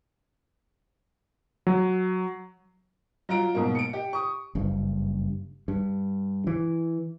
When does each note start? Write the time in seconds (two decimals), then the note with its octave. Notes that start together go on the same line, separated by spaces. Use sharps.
1.67 F#3
3.29 F#3 F4 A#5 D7
3.55 G#2 B2 F#3 A#3
3.75 C#7 D7
3.93 G4
4.13 C#6 D#6
4.55 F#1 G2
5.68 G2
6.47 E3